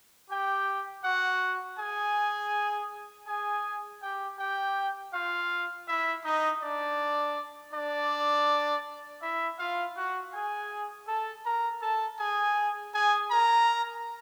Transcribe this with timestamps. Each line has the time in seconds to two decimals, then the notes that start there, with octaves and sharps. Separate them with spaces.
0.31 G4 G5
1.05 F#4 F#5
1.79 G#4 G#5
3.28 G#4 G#5
4.02 G4 G5
4.39 G4 G5
5.14 F4 F5
5.88 E4 E5
6.25 D#4 D#5
6.63 D4 D5
7.74 D4 D5
9.23 E4 E5
9.59 F4 F5
9.97 F#4 F#5
10.34 G#4 G#5
11.08 A4 A5
11.45 A#4 A#5
11.82 A4 A5
12.19 G#4 G#5
12.94 G#4 G#5
13.31 A#4 A#5